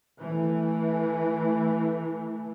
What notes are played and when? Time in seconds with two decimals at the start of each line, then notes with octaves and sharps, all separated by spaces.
0.19 E3 A3